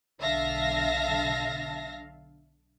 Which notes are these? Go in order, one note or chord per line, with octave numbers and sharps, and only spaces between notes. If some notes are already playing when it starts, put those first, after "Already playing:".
B1 D3 E5 F5 A5 A#6